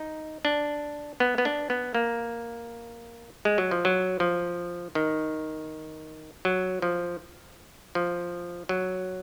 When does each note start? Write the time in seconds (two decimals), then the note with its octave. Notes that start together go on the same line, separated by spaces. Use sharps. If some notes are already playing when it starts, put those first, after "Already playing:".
Already playing: D#4
0.45 D4
1.20 B3
1.38 B3
1.45 D4
1.70 B3
1.95 A#3
3.45 G#3
3.58 F#3
3.71 F3
3.85 F#3
4.20 F3
4.95 D#3
6.45 F#3
6.82 F3
7.95 F3
8.69 F#3